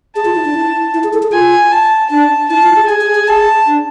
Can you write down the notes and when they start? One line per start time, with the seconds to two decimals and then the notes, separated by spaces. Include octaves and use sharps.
0.16 G#4 A5
0.25 F4
0.35 E4
0.45 D4
0.54 E4
0.94 E4
1.04 G#4
1.13 A4
1.23 G#4
1.32 F4 G#5
1.72 A5
2.10 D4 A5
2.49 E4 A5
2.63 F4
2.76 G#4
2.88 G#4 G#5
3.01 G#4
3.15 G#4
3.27 G#4 A5
3.67 D4